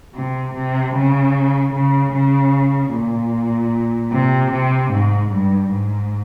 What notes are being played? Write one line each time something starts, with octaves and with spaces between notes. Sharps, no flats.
C3
C3
C#3
C#3
C#3
A#2
C3
C3
G#2
G2
G#2